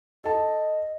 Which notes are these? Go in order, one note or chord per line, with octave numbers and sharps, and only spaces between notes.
A4 D#5 A5